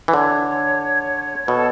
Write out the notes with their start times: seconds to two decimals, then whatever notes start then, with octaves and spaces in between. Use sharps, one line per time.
0.08 E3
0.13 D3 C#5
1.47 B2 A4